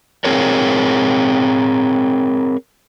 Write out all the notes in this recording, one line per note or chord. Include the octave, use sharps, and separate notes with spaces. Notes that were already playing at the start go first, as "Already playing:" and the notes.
C4 G#4 A#4 C#5